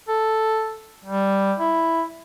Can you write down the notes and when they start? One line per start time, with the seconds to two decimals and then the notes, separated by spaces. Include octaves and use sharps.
0.08 A4
1.05 G3
1.59 E4